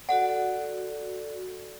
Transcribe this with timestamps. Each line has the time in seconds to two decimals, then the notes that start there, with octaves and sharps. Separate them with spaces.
0.09 F#4 A4 D5 F#5